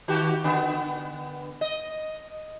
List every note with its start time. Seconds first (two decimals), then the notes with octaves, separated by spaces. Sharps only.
0.08 D#3 F#4 G4
0.44 D3 B3
1.61 D#5